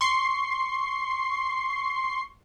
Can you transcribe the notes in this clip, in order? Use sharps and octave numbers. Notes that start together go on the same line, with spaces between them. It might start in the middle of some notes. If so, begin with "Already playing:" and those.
C6 C#6 C7